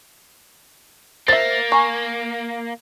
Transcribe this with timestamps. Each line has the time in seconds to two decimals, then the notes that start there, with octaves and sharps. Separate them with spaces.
1.28 A#3 C5 E5 A6
1.72 G#5 A#5 C#6